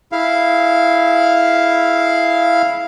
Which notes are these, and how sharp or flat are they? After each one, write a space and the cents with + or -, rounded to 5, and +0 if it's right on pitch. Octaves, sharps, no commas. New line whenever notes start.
E4 +0 G#4 +30 F5 -5